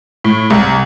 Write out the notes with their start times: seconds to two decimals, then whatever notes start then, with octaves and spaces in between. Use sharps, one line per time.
0.24 A2
0.50 C2